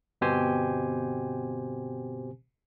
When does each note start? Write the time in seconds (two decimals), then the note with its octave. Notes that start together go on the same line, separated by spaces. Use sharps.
0.21 G1 B2 C4 G4 C5 G#5